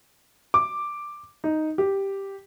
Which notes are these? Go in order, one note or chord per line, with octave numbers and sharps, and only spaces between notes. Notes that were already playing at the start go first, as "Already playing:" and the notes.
D6
D#4
G4